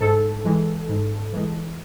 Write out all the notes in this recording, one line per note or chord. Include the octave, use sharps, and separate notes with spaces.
G#2 A4
E3 G#3
G#2
E3 G#3